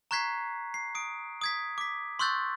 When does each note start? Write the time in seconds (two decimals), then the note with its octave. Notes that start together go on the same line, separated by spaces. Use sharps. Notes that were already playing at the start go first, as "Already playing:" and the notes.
0.11 A#5 C#6 F#6 G#6 B6 C7
0.74 C7
0.95 D#6 D7
1.42 D#6 G#6 B6
1.78 D6 B6
2.19 C6 C#6 E6 F#6 G6 A6